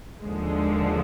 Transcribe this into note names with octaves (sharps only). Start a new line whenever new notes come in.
D#2 D3 F3 G#3